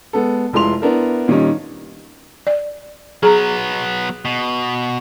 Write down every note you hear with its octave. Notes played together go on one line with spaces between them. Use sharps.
G#3 B3 A4
F1 G#3 E4 F4 C6 F7
B3 D4 E4 A#4
A#2 D#3 G3 C#4 D#4
D5
F#3 B3 G#4 A#5
B2